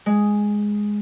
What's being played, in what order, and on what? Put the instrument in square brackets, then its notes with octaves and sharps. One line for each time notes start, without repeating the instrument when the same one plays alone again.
[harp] G#3